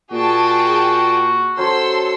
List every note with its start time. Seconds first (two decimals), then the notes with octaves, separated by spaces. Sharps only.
0.12 A#2 F#4 G#4 G5 A5
1.57 F#3 C#4 A4 C5 C6 E6